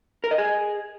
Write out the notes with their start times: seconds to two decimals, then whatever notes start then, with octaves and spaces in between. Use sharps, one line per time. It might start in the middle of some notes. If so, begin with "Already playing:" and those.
0.24 A#4
0.31 D#5
0.38 G#4